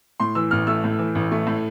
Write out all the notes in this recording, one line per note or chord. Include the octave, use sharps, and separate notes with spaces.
A2 C6
E3 E6
A1 F6
A3 E6
A2
E3
A1
A3
A2